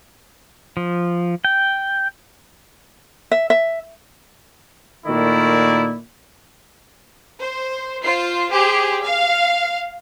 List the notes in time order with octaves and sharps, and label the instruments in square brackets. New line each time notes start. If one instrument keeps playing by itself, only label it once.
[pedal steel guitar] F3
G5
[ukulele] E5
E5
[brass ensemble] A#2 D#3 A3 E4 D5
[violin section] C5
F4 C5 C7
G4 G#4 C5
F5